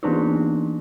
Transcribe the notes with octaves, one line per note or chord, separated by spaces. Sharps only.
E3 A#3 B3 D4 D#4 F4